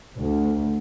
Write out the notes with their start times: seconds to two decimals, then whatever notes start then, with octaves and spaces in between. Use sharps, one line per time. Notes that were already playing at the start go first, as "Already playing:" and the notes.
0.16 D2